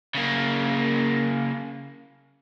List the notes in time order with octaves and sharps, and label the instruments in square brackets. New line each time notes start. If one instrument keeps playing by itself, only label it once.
[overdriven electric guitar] C#3 A#3